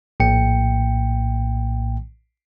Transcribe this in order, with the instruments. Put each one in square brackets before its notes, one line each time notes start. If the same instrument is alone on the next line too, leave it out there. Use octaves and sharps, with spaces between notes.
[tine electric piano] A#1 A2 A#3 G5 C#7